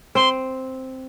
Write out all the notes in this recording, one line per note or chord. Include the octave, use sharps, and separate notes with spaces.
C4 C6